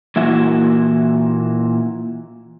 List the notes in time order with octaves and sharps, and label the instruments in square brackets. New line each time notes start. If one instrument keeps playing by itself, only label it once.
[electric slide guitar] A#2 E3 A#3 E4 F#4 E5